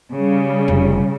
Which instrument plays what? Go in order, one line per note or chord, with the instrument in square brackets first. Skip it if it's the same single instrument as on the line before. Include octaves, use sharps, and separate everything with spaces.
[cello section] C#3 G3
[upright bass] F1